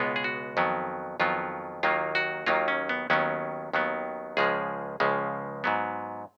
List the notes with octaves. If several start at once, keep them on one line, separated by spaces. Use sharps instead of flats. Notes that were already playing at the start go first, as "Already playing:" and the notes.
Already playing: C#2 B2 G#3 B3 F4
G#4
F#4
F2 D#3 F#3 B3
F2 D#3 F#3 B3 F4
D#2 D#3 F#3 A#3 F4
F#4
D#2 D#3 F#3 A#3 F4
C#4
B3
D#2 D#3 F#3 B3 C#4
D#2 D#3 F#3 B3
C#2 C#3 F3 G#3 G#4
C#2 C#3 F3 G#3
G#2 F#3 B3